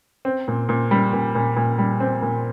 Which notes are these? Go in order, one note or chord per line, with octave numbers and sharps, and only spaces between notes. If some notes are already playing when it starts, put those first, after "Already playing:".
C4
A#2
A#2
G3
A#2
A#2
A#2
G3
C4
A#2